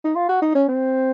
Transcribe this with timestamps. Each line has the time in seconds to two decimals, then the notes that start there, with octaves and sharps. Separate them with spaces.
0.04 D#4
0.16 F4
0.29 F#4
0.42 D#4
0.55 C#4
0.68 C4